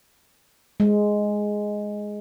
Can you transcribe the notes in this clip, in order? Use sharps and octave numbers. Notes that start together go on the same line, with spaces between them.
G#3